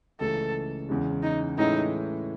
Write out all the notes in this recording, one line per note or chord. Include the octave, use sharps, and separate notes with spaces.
C#2 C#3 E3 A3 A4
E2 C#3 E3 G#3
D#4
A2 E3 G#3 C#4 D#4 E4